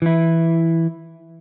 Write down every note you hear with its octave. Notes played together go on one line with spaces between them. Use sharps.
E3 E4